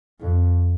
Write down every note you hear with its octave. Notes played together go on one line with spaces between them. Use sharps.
F2